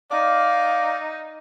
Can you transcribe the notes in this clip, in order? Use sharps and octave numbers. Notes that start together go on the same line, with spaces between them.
D#4 D5 F5